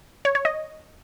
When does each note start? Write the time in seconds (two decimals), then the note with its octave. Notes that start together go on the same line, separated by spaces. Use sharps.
0.25 C#5
0.35 C#5
0.45 D#5